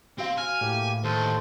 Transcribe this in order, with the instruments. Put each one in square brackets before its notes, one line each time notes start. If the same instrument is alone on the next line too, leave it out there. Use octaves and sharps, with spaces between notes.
[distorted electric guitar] C4 [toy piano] F#4 F5
[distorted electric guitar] G#5 [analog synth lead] F6
[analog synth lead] A2 [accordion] A#3 G4
[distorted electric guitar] D#2 [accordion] A4 C5